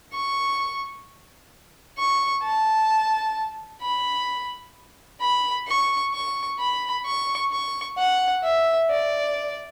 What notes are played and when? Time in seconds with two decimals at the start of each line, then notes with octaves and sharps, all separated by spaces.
0.13 C#6
1.98 C#6
2.43 A5
3.81 B5
5.20 B5
5.67 C#6
6.13 C#6
6.59 B5
7.06 C#6
7.51 C#6
7.98 F#5
8.43 E5
8.90 D5